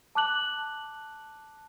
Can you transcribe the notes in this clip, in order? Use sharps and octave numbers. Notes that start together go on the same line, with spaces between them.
A5 D6 F#6 F#7